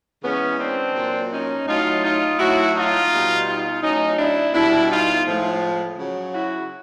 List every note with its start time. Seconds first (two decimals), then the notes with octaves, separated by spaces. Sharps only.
0.23 C#3 E3 G#3 B3 C#4
0.59 C4 D4
0.95 A#2 F#3
1.31 C#4 D#4
1.67 A2 F#3 D#4 F4
2.03 D#4 F4
2.38 A2 F#3 E4 F#4
2.74 D#4 F4
3.10 B2 G3
3.46 D#4 F4
3.82 A2 F#3 C#4 D#4
4.18 D4 E4
4.53 B2 G3 D4 E4
4.90 D#4 F4
5.26 A2 F3 G#3
5.97 C#3 F#3
6.33 E4 F#4